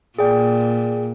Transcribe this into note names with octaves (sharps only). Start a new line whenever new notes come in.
A#2 G#4 D5 G5